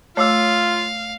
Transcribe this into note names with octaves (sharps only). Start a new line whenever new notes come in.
A3 F4 C#5 F5 D6 E6